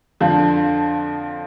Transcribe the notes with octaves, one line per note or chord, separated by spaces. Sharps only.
F2 D3 F3